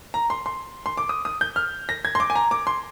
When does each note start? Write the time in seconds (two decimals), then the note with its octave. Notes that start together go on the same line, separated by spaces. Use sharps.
0.14 A#5
0.30 C6
0.46 C6
0.86 C6
0.97 D6
1.09 D#6
1.25 D#6
1.41 G6
1.56 F6
1.89 A#6
2.05 G#6
2.15 C6
2.20 D6
2.30 G#5
2.36 A#5
2.51 D6
2.67 C6